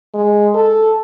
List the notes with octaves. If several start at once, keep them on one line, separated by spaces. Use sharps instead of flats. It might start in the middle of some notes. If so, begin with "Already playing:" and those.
G#3
A4